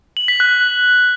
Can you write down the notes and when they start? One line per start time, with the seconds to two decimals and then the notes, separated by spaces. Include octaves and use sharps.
0.17 F#7
0.28 B6
0.40 F#6